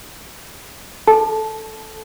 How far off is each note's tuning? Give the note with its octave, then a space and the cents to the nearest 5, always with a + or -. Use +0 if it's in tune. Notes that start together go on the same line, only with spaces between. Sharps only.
A4 +0 A5 -15